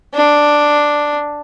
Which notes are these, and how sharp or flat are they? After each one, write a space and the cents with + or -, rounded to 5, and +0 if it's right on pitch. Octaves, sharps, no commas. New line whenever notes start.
D4 +5